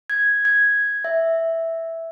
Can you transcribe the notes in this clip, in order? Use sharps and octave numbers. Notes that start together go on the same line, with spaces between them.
G#6
G#6
E5